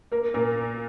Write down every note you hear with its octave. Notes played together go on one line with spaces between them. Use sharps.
A#3 A#4
A#2 A#4